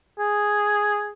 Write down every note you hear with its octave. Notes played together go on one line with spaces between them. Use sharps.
G#4